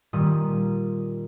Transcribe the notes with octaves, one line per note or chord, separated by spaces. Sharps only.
A#2 D#3 G3 D#6